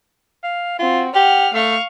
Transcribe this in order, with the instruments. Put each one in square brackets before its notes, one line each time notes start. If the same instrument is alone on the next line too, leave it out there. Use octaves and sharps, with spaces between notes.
[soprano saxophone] F5
[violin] C4 F#4 [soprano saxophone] F4
[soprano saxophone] G4 [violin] F#5 F6
[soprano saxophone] A3 [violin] F5 C#6